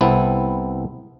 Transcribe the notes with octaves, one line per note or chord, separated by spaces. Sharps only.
C2 B3 C4 E4 A4